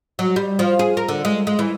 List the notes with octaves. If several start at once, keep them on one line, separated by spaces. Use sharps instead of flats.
F#3
G3
F3
G#4
A#4
D3
G#3
G#3
E3